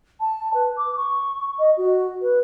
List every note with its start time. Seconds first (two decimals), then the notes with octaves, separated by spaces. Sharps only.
0.20 A5
0.54 B4
0.77 D6
0.96 C#6
1.59 D#5
1.77 F#4
2.21 B4